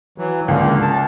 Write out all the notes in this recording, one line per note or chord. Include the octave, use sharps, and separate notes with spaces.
E3 F#3
C#2 D3 A#3
A5